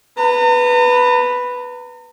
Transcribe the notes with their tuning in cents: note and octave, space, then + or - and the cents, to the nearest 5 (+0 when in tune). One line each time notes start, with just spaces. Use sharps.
B4 +0 A#5 -40